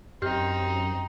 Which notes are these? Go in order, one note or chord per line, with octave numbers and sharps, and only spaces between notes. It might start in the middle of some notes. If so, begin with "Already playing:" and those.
F#2 C4 D#4 G4 F6 G6